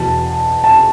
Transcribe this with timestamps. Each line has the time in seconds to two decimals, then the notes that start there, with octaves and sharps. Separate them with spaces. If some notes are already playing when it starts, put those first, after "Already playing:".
Already playing: E2 B2 A5
0.64 A5